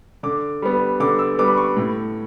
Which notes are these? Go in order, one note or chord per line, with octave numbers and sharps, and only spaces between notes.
D3 D6
G3 B3
D3 D6
E6
G3 B3 D6
B5
C#6
A2